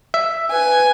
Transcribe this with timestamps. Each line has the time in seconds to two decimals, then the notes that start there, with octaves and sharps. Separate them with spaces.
0.14 E5
0.52 B4 G#5